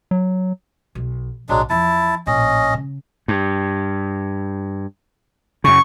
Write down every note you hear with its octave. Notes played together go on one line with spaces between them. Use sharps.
F#3
B1
B1 A2 F#3 G#3 D4
E2 F3 E4 A5
A#1 A2 C#4 D#5
C#3 C#4
G2
F#2 C#3 C#6